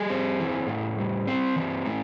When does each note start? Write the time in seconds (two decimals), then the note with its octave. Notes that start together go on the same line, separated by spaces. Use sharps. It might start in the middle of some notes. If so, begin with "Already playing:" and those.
Already playing: G3 G#4
0.10 C4
0.39 E3
0.68 A2
0.98 G3
1.27 C4
1.56 E3
1.86 A2